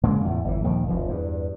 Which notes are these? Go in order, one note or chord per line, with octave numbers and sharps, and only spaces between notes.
C#3 G#3 A#3
E2 A2
G1 E3
A#1 D#2 D#3
F1 D2 F3
E2 G2